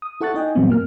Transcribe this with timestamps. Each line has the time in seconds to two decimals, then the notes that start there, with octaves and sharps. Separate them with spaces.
0.02 D#6
0.21 E4 A4 F#5 C#6 F#6 A6
0.34 D#4 D#5 G5 G#5
0.55 A#2 E3 F#3 G3 B3 C4
0.69 G2 A#3 F6